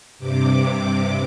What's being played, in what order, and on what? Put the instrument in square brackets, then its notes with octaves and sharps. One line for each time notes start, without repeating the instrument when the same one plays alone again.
[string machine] G2 C3 D6